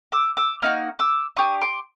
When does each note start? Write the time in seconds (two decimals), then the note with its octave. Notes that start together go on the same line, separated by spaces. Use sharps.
0.12 D6 E6
0.37 D6 E6
0.62 A#3 D#4 F#4 F6
0.99 D6 E6
1.36 D4 G4 C#6 D#6
1.61 C6 D6